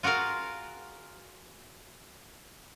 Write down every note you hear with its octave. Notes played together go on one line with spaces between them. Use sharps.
F4 F#4 G#4 A#4 F5